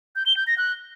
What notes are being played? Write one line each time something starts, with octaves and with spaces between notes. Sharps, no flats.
G6
G7
G6
A#6
F#6